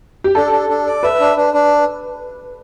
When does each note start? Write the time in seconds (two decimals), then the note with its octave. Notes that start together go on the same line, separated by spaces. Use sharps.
0.24 G4
0.35 D4 A4
0.52 D4
0.69 D4
0.87 D5
1.03 B4 E5
1.20 D4
1.37 D4
1.54 D4